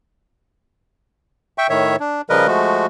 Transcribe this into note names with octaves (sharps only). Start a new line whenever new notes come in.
E5 G5 C#6
A2 D#3 C#5 E5
D4
C#3 F3 G3 A#4 B4 D#5
F3 G#3 A3 F#4